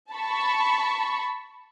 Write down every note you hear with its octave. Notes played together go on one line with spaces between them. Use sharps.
A5 B5 C#6